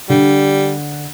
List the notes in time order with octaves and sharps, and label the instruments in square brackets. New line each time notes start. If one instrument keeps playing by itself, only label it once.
[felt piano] D3 [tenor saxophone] G3